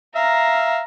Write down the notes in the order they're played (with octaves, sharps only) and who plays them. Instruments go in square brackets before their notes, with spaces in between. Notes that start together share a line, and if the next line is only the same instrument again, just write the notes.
[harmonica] E5 F5 [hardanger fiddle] A#5